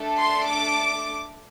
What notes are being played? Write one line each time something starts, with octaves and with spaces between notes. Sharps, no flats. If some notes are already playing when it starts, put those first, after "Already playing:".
Already playing: A3 D4 A4
C6
D6